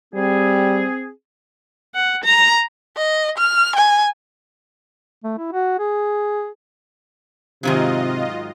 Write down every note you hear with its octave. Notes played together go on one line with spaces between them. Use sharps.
G3 C4 G#4
F#5
A#5
D#5
F6
G#5
A3
E4
F#4
G#4
G#2 C3 D#3 F#3 F4 D#5